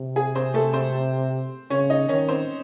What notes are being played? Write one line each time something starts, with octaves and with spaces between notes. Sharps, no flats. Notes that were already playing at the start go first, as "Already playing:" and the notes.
Already playing: C3
G#4
C4 C5
A3 A4
C4 C5
C#3 C#4 C#5
D#4 D#5
D#3 C#4 C#5
C4 C5